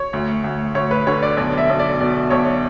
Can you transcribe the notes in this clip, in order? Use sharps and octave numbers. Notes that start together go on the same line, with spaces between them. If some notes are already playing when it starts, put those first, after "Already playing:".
Already playing: C#5
D2
D2
D2 C#5
B4
D3 C#5
D5
B1 D5
E5
B1
D5
B2 D5
B1 C#5